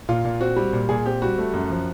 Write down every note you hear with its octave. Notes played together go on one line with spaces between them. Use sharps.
A#2 F4
A#2
C4 F#4
G3
A#2
A#2 G#4
C4 G4
G3 F#4
A3
F#2
F3